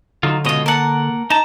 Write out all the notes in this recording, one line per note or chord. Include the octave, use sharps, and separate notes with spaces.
D3 F#3 D#4 F4
C#2 B2 F4 C#5 D#5
A#3 A#4 F#5 A5
D#4 A5 A#5